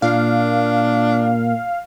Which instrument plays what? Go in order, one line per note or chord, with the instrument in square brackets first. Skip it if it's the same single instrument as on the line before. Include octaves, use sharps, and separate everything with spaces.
[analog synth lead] A#2 [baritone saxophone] D4 [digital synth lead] F5